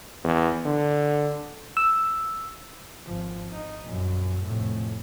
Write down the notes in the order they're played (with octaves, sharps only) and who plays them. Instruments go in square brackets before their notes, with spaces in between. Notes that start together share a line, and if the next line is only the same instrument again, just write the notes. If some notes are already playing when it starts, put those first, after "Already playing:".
[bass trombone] E2
D3
[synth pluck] E6
[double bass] G#1 F3
D#4
A#1 F#2
F1 A2